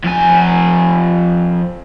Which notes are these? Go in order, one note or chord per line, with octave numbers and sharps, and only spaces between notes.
F2 G#5